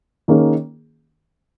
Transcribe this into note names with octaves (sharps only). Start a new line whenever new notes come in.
D#3 A#3 C#4 G#4